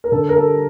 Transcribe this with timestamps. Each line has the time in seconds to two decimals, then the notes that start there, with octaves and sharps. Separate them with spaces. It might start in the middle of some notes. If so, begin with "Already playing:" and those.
0.04 A#4
0.12 D3 A4
0.29 A#4
0.37 G3 A4